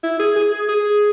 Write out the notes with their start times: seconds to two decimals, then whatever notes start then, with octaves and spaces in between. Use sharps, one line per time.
0.03 E4
0.19 G#4
0.36 G#4
0.53 G#4
0.69 G#4